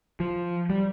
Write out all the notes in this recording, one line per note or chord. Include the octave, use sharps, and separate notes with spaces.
F3
G3